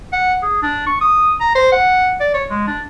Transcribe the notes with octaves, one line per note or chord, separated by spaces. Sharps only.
F#5
G#4
D4
C#6
D#6
A#5
C5
F#5
D5
C#5
G#3
D4